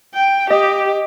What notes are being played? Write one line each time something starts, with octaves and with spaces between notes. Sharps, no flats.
G5
G4 D#5